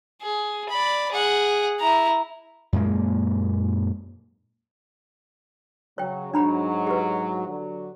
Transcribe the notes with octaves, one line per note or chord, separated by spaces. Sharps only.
G#4
D5 B5
G#4 F#5
E4 A#5
F#2 A#2 G#3 A#3
C#3 F#3 C#5 G5
G#2 F#3 D4 A#5 B5
G4 B4
D3 F#3